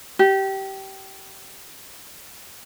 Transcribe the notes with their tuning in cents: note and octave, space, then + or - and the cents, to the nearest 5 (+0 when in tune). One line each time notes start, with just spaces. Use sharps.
G4 -20